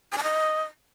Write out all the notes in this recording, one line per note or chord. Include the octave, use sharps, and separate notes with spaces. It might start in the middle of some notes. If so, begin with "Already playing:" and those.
G#5
A5
D#5